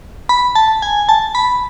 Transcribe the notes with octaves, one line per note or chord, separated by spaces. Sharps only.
B5
A5
G#5
A5
B5